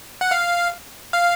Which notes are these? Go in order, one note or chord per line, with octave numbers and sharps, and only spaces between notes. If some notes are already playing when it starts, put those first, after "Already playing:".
F#5
F5
F5